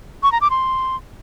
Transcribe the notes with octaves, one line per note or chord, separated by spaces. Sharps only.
C#6
A#5
D6
C6